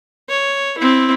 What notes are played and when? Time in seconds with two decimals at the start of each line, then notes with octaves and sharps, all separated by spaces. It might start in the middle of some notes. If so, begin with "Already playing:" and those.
0.29 C#5
0.78 C4 E4